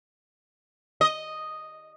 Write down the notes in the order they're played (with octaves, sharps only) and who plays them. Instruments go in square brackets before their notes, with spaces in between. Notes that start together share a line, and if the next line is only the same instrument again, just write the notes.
[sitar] D#5